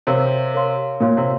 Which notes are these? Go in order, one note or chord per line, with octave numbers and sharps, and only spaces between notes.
C3 A#4 C#5 F5 C6
A#4 C#5 F5 C6
A#2 A#4 C#5 F5 C6
C3